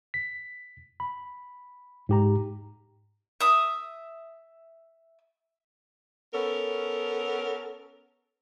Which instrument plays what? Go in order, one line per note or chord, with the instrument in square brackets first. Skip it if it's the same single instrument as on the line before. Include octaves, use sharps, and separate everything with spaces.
[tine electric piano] B6
B5
G#2 G4 A#5
[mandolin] E5 D#6
[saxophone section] B3 C#4 A4 A#4